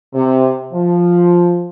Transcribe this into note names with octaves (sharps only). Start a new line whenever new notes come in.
C3
F3